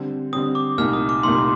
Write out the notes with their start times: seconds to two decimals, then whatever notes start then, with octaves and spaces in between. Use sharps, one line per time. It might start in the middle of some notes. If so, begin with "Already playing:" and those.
Already playing: D3 G3 C4
0.33 D3 G3 C4 D#6
0.55 D6
0.78 C2 A#2 A3 D#4 F6
0.93 D#6
1.09 D6
1.23 C2 A#2 A3 D#4 C6